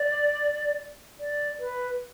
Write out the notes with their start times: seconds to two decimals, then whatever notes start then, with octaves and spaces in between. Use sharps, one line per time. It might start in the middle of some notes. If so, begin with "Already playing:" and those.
Already playing: D5
1.20 D5
1.60 B4